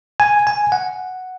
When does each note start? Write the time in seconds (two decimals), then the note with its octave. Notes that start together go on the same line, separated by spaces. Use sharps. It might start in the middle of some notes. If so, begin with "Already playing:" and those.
0.20 G#5
0.47 G#5
0.72 F#5